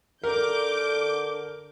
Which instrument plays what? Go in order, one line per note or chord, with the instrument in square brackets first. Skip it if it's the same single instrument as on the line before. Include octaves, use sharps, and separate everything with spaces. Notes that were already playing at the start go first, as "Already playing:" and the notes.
[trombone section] D3 [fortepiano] A#4 [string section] D6 G6